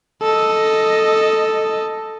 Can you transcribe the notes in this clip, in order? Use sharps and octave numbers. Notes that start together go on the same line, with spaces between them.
A4 D#5